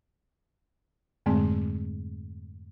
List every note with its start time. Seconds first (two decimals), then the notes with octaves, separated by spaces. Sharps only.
1.26 F2 G#2 D3 G#3 A3 C4